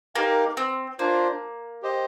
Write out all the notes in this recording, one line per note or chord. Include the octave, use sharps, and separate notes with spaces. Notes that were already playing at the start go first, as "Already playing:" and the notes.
A#3 D#4 G4 A#4 F5
C4
A#3 D4 F4 C5
G4 C5 D#5